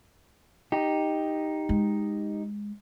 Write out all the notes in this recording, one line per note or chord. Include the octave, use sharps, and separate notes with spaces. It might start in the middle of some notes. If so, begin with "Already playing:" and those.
D#4 G4
G#3